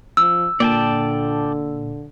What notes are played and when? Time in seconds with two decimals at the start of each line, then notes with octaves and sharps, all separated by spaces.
0.17 F3 E6
0.60 A#2 D3 D5 G5 A5